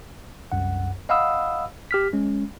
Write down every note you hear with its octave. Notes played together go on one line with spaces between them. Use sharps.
C2 F#2 F#5
D#5 F5 F#5 B5 D#6 E6
G4 F6 B6
G#3 C#4